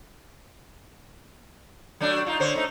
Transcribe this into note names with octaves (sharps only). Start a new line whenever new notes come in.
F#3 A3 D4
D#4 F4
D3 C5 C#5
A3 D#4